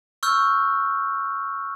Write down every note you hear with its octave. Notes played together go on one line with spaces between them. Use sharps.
C#6 E6 F6 G6